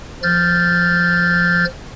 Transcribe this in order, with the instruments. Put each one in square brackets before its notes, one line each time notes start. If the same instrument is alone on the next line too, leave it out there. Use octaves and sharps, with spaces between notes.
[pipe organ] F3 F6 G6 A6